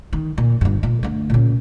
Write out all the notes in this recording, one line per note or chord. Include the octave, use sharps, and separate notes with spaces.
D#3
A#2
G1 G2
A#2
D3 A3
A#2 C#3